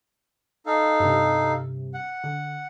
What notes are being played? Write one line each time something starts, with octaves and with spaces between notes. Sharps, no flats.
D#4 A4 F5
G2 C3
F#5
D3